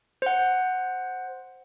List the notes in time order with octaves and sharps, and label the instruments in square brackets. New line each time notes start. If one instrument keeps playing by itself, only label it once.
[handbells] C5 F#5